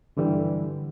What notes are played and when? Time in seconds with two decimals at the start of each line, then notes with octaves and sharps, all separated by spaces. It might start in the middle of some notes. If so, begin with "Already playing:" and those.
0.17 G2 D3 E3 G3